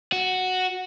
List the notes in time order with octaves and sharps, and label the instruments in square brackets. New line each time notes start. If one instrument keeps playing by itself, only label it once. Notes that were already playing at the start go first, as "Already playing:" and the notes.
[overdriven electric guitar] F#4